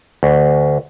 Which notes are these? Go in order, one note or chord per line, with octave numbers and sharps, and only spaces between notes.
D2